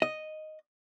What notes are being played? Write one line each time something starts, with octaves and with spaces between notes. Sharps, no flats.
D#5